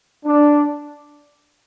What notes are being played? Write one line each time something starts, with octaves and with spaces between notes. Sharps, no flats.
D4